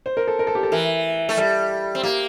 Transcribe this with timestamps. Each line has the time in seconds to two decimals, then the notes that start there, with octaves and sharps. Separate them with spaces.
0.06 C5
0.17 A#4
0.27 A4
0.39 A#4
0.47 A4
0.55 G4
0.63 A4
0.72 E3 A#4
1.29 A3
1.37 G3 A4
1.95 C4
2.03 A#3 G4